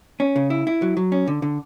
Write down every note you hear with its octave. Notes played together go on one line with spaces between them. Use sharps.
C#4
C#3
E4
E4
F#3
F#3
C#4
D3
D3